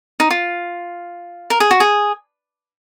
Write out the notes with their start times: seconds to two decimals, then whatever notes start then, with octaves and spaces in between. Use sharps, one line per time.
0.20 D#4
0.30 F4
1.50 A#4
1.60 G#4
1.71 F#4
1.80 G#4